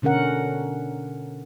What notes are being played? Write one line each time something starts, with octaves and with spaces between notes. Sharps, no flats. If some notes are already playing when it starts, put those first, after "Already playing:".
B2 D3 C#4 A#4 F#5